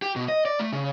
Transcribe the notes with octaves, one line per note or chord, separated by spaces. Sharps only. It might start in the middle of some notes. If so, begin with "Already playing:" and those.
G4
B2
D#5
D5
A3
C#3